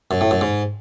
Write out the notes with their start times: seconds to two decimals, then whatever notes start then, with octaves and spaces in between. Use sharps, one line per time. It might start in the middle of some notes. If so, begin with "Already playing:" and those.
0.11 F#2
0.21 A2
0.31 F#2
0.41 G#2